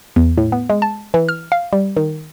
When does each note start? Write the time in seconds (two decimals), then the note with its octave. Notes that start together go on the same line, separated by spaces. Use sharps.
0.16 E2
0.38 A2
0.52 B3
0.70 G#3
0.82 A5
1.14 E3
1.29 F6
1.52 F5
1.73 G3
1.97 D#3